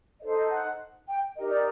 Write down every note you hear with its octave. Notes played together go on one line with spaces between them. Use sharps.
D#4 A4 C5 D#5
D#5
F#5
G5
D#4 G4 A#4 D#5
D5